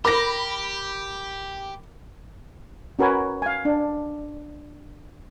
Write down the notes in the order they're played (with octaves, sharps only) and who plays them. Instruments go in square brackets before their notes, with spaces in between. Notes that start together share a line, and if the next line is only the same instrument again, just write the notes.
[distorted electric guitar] G4 [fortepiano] A#4 D6 [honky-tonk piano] B5 A#6
[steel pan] C#4 F#4 A#4 B4 G#5
F5 G#5
D4